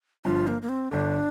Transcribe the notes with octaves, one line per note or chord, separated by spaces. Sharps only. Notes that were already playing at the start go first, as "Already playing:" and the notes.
G1 G2 F3 F4
A#3
A#3
C4
G1 G2 D3 D4